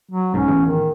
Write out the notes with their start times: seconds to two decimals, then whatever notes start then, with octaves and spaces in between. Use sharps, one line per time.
0.11 F#3
0.34 B1 G#2 C#4
0.48 A1 E2
0.67 D#3